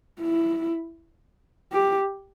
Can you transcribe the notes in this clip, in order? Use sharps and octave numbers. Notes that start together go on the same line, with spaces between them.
E4
G4